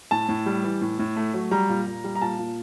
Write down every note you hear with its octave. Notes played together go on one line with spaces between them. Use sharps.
A2 A5
A2
G3
E3
A2
A2
A3
F#3
G3 A#5
A#2
A#2
G3
A#5
A#2 A5
A#2